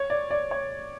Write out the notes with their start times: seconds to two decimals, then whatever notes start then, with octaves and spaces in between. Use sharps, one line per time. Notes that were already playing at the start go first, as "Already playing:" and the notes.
Already playing: C#5
0.10 D5
0.31 D5
0.51 C#5